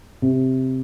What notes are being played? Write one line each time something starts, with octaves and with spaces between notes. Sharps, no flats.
C3